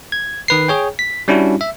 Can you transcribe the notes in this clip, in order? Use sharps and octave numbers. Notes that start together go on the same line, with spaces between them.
G#6
D#3 B4 C7
G#4 C#5 G5
B6
G3 C#4 D4 E4 F#4
E5